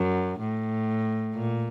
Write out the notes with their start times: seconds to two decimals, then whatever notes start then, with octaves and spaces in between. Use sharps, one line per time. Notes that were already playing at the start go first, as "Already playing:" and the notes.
Already playing: F#2
0.39 A2
1.34 A#2